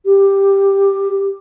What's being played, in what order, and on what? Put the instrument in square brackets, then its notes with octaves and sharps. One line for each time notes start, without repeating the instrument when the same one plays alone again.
[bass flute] G4